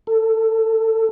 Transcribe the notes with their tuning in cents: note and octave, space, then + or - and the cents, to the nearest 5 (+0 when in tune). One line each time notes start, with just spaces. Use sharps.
A4 +20